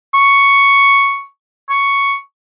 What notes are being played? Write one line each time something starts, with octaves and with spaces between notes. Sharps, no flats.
C#6
C#6